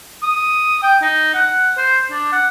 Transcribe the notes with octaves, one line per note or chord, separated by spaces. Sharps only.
D#6
G5
D#4
F#5
C5
D4
F#5